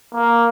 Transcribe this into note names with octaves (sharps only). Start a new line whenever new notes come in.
A#3